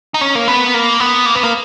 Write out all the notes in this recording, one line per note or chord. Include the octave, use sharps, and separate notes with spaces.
D#4
C#4
A#3
B3
A#3
B3
A#3
B3
A#3